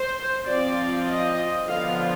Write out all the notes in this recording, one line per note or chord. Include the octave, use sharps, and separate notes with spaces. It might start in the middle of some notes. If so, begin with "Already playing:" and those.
Already playing: C5
F3 C4 F4 D5
D#5
D3 F3 B3 F4 F5